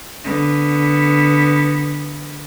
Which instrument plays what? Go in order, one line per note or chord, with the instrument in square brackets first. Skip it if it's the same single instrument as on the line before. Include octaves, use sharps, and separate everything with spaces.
[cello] D3 B3